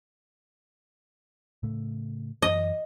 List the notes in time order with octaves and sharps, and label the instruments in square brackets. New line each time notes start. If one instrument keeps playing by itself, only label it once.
[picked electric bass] A2 C#3 A3
[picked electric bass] F#2 E3 [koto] D#5